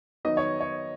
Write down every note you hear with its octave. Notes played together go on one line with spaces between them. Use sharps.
D#3 F#3 B3 D#4 D#5
C#5
C#5